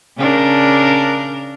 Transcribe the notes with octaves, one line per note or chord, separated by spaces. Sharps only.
C#3 D4 A#4